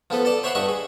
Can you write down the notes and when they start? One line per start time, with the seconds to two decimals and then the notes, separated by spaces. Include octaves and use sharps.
0.10 F3 B3 A4 B4
0.25 A4 D5 A5
0.43 C5 C#5 E5 F#5 B5 C6
0.55 G2 D#5 E5 F#5 C#6
0.68 G#4